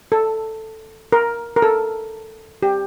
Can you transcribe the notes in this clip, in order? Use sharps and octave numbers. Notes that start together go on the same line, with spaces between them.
A4
A#4
A#4
A4
G4